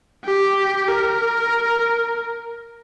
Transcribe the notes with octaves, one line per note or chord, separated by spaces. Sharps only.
G4
A#4